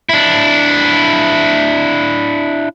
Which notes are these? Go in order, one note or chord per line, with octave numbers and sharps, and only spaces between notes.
D4 E4